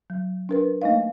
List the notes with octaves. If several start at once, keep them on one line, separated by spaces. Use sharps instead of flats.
F#3
D4 A#4 B4
A3 A#3 D#4 D#5 F5